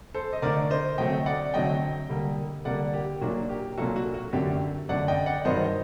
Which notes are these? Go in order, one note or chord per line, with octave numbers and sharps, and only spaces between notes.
A4 C5
D#5
D3 A3 D4 A#4 D5
C5 D#5
D3 F#3 A3 C4 D#5 G5
D5 F#5
D3 F#3 A3 C4 D#5 G5
D3 G3 A#3
D3 G3 A#3 D5 F#5
G4
A#2 F#3 A#3 D4 F#4
G4
A#2 F#3 A#3 D4 F#4 A4
F#4
F#4
F#2 D3 A3 D4 G4
F#2 D3 A3 D4 D5 F#5
D#5 G5
D5 F#5
G2 D#3 F#3 C5 D#5